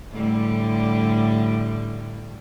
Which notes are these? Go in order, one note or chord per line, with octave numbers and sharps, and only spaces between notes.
A2 D3 G3